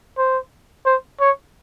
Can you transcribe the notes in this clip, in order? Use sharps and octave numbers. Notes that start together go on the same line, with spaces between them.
C5
C5
C#5